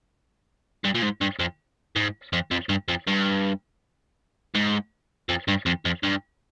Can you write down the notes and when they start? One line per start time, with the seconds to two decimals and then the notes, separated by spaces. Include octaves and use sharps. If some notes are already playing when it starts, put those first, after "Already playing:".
0.85 G2
0.95 A#2
1.03 G#2
1.21 G2
1.40 F2
1.96 G#2
2.33 F2
2.51 F2
2.69 G2
2.88 F2
3.07 G2
4.55 G#2
5.29 F2
5.48 G2
5.66 F2
5.85 F2
6.03 G2